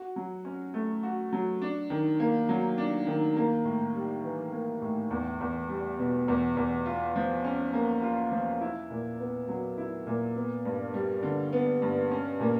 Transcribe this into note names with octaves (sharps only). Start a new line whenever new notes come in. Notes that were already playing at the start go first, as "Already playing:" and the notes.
Already playing: F#4
F#3
C#4
A3
F#4
F#3
D4
D#3
A#3
F#3
D4
D#3
A#3
A2
G3
E3
A#3
A2
E2
E2
G3
B2
E2
E2
F4
F3
C#4
A#3
F4
F3
E4
A#2
B3
F#3
E4
A#2
B3
G2
G3
D3
B3
G2
C#4
A#2